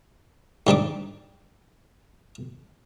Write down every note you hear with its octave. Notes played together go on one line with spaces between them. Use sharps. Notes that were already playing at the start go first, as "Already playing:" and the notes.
G#2 G3 D4 D6